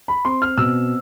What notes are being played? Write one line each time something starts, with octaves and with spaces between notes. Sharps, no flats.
B5
C4 C6
F6
B2 E6